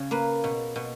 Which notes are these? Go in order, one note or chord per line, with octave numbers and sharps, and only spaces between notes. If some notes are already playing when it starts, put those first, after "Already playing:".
Already playing: C#3
A#3 B4
B2
B2